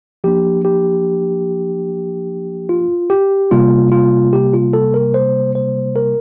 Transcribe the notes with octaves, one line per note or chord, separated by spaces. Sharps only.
F3 A#3 D4 G4
G4
F4
G4
C3 G3 A#3 F4
F4
G4
F4
A4
A#4
C5
C5
A#4